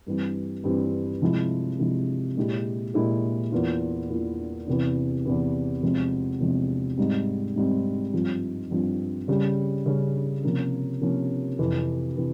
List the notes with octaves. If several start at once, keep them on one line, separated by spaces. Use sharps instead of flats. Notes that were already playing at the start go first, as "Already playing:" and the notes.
G2 E3 G3 C4
G2 E3 G3 C4
C3 F3 G#3 E4
C3 F3 G#3 E4
A#2 G#3 E4 G4
A#2 G#3 E4 G4
E2 E3 A#3 F4
E2 E3 A#3 F4
E2 C3 E3
E2 C3 E3
E2 C3 F3 G#3 C4
E2 C3 F3 G#3 C4
G#2 G3 C4
G#2 G3 C4
G2 F3 C4 F4
G2 F3 C4 F4
C#3 G3 C#4
C#3 G3 C#4
C3 F3 A#3 C#4
C3 F3 A#3 C#4
F2 C3 E3
C3 E3